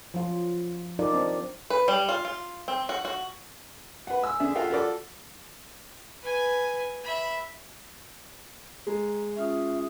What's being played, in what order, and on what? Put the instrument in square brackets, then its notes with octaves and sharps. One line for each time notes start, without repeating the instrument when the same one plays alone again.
[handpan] F3 F#3 F4
F#3 D#4 F4 A#4 D5
C4 D4
[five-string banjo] B4
G3
F4
F4
C4
F#4
F#4
[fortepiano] B4 F#5
G#5 E6
D3 D4 G#4 E5
F4 F#4 A4 E5 F5 G5
F4 F#4 A4 D5
[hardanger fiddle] B4 G#5
E5 B5
[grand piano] G#3 [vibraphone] A#5
[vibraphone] C#4 F4 D#6 [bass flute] E5